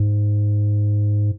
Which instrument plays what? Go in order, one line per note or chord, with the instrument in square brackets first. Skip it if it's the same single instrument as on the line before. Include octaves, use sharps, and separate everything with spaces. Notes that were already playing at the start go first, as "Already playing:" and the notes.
Already playing: [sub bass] G#2